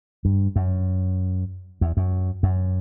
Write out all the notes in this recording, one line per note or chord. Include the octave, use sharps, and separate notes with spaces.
G2
F#2
E2
F#2
F#2